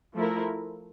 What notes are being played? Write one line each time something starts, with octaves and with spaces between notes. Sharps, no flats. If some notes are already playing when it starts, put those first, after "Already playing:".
F3 A3 E4 A#4